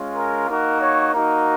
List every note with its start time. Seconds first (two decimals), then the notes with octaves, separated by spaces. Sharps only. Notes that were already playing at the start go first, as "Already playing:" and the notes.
Already playing: G#3 C#4 F4
0.15 A#4
0.48 A#3 D#4 F#4 A#4
0.81 C#5
1.13 A#3 D#4 F#4 A#4